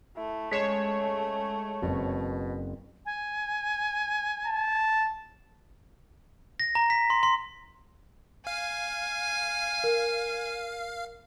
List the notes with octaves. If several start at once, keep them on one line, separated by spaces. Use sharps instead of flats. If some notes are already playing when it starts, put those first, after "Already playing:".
A3 E4
G#3 C#4 C#5 B6 C7 E7
F#1 B2 C4
G#5
A5
A#6
A#5
B6
C6
C6
F5 G#5
A#4